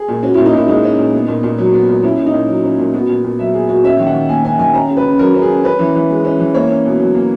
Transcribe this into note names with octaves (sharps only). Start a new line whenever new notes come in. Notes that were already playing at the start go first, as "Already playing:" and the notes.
Already playing: G#4
A#2
C#4 F#4
A#2 E4
D#4
A#2 E4
G#3 D#4
C#4
A#2
B3
A#2
A#2
F#3
B3
A#2
C#4 E4
A#2
D#4
A#2
F#3
C#4
A#2
B3 F#4
A#2
A#2
F#3 E5
B3 G#4
A#2 F#4
C#4 E5
D#3
F#5
D#3
A#3 G#5
C#4 G#5
D#3 G#5
C#4 A#5
C#3
B4
C#3
F#3 A#4
C#4
G#4
C#3
C#4 B4
E3
E3
G#3
C#4
E3
A#3 C#5
C#4
B2
F#3
A#3